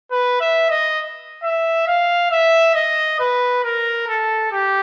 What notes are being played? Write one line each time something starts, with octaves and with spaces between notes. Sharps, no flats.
B4
E5
D#5
E5
F5
E5
D#5
B4
A#4
A4
G4